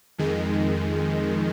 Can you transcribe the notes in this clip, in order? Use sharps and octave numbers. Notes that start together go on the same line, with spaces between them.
F2 D#3 G#3